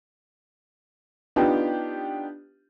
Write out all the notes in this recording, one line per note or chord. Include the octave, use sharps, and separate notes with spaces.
B3 D4 D#4 F4 G4